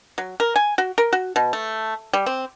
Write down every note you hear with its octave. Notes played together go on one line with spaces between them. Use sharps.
F#3
A#4
G#5
F#4
A#4
F#4
B2
A3
G3
C4